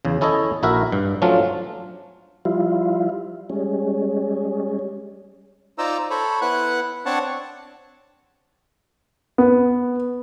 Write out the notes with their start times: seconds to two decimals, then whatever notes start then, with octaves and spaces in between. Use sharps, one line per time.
0.05 E2 C#3
0.21 C#4 E4 A4 C#5 D#5
0.63 A#1 E4 F#4 A#4 E5
0.92 G2
1.22 F3 F#3 A3 C#4 D4 F4
2.45 F3 G3 E4 F4
3.50 G3 G#3 C#4
5.78 D#4 F4 C5 D5 A#5 E6
6.10 A4 C5 C#5 B5
6.41 B3 E4 B4 F#5 F#6
7.06 C4 D4 C#5 F#5 A5
9.38 B3